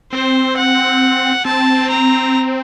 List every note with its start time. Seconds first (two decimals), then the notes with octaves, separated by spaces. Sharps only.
0.12 C4 C5
0.57 F#5
1.45 C4 A5
1.90 A#5